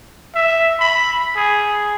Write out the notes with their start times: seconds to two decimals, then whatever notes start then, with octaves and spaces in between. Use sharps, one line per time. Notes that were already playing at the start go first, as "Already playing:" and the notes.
0.35 E5
0.80 B5
1.36 G#4